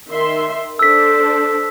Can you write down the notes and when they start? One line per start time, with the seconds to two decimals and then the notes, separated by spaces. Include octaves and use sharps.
0.10 D#3 E5 C6
0.79 D4 A4 C5 E6 B6